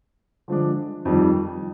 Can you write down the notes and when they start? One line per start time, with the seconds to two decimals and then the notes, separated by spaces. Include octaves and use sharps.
0.48 D3 F3 G#3 D4
1.05 F2 D#3 G3